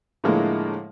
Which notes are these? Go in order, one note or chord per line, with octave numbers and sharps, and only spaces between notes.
A2 D3 F3 G#3 A#3 E4